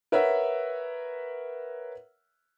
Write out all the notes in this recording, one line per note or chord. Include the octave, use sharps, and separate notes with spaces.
A#4 B4 C#5 E5 F#5